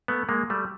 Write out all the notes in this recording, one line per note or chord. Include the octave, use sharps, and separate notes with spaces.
A3 B3
G#3 A#3
G3 A3